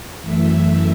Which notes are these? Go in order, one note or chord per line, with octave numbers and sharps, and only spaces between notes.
F#2 E3 A3 E5